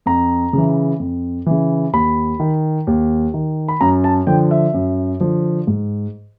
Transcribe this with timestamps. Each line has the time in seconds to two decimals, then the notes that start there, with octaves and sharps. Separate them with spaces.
0.06 F2 A#5
0.53 C#3 E3
0.99 F2
1.46 C#3 E3
1.93 D#2 B5
2.40 D#3
2.87 D#2
3.34 D#3
3.68 B5
3.81 F#2 A#5
4.04 A5
4.27 D3 F3 G5
4.51 E5
4.74 F#2
5.20 D3 F3
5.67 G#2